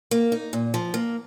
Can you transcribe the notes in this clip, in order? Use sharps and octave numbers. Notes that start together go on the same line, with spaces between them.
A#3
D#4
A#2
F3
A#3